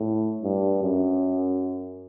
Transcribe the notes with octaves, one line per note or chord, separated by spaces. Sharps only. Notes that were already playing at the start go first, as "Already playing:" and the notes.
Already playing: A2
G2
F#2